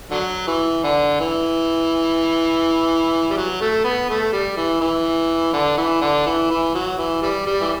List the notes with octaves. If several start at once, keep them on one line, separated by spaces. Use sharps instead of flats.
D3 F#3
E3
D3
E3
G3
F#3
A3
B3
A3
G3
E3
E3
D3
E3
D3
E3
E3
F#3
E3
E3 G3
G3
E3